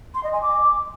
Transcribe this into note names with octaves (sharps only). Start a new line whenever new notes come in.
C6
D#5
G#5
D6